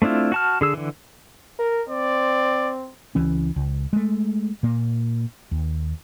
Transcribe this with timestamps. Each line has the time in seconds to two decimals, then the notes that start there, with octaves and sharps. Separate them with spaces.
0.02 A3 C4 D4 E4 F4
0.32 F#4 A5 F6
0.61 D3 G#4 E6
0.74 D3 E3
1.59 A#4
1.89 C4 D5
3.15 C#2 E3 C#4
3.56 C#2
3.93 G#3 A3
4.63 A#2 A#3
5.51 D#2